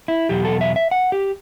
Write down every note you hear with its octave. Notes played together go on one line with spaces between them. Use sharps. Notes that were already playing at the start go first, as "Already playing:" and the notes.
E4
E2 B2 F#3 B3 G4
A4
E5
E5
F#5
G4